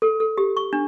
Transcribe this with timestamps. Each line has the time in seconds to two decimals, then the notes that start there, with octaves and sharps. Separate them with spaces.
0.02 A4
0.20 A4
0.38 G4
0.57 C#6
0.73 D4